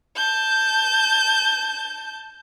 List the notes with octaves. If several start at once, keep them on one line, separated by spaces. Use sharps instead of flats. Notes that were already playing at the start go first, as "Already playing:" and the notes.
A5 G6